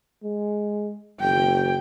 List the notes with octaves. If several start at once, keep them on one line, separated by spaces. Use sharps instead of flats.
G#3
F#1 G5